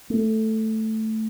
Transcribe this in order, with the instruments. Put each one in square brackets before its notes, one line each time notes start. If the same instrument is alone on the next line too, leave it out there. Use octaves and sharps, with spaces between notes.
[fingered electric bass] A3